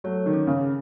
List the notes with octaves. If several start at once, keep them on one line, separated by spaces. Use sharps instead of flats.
F#3 A3 C#5
D#3
C#4
C#3
G#4